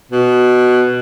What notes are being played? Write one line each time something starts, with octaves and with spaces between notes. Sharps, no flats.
B2